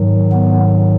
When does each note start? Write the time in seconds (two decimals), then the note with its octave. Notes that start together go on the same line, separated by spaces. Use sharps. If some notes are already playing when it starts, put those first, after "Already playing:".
Already playing: G#2 D#3 F#3
0.32 B3